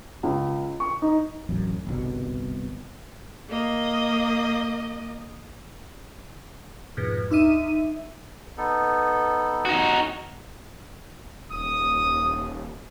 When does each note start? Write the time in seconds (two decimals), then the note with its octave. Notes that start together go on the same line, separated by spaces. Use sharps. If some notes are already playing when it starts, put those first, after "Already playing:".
0.23 C#2
0.80 C#6
1.02 D#4
1.49 D1 A1 F#2
1.87 G1 C2 B2
3.49 A#3 D#5
6.97 F2 G#2 B2
7.30 D2 D#4 E5 D#7
8.57 B3 D#4 A4
9.65 D#4 F#4
11.51 D#1 D#6